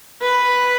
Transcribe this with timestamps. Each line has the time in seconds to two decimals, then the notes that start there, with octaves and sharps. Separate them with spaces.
0.22 B4